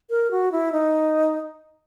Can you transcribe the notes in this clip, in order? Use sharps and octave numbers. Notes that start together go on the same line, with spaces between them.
A#4
F#4
E4
D#4